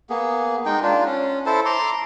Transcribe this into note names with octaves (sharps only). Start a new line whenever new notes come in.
A#3 B3 G#4
G#3 D#4 G5
D4 F4
C#4
E4 A4 C5 A5
A#5 C6 D6